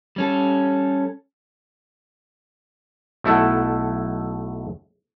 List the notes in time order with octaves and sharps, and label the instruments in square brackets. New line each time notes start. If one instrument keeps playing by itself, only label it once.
[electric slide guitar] G3 C#4 A4
[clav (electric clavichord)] B1 A3 E4 A4 F#5